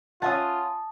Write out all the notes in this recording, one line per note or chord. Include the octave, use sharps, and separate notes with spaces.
C#4 F4 E5 F#5 A5 D#6